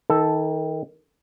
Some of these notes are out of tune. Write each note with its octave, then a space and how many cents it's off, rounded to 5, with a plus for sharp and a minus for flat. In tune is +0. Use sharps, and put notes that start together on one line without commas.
D#3 +25 A4 +0